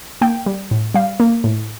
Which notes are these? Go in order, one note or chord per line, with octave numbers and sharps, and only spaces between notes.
A#3 G5
G3
A2
G3 F5
A#3
A2